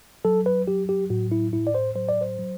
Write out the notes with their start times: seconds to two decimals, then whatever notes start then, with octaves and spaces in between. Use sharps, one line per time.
0.25 F#3 A4
0.46 B4
0.68 F#3 G4
0.89 G4
1.10 A2 F#4
1.32 E4
1.53 A2 E4
1.67 D5
1.75 C5
1.95 F#3 C5
2.09 D5
2.21 C5
2.39 F#3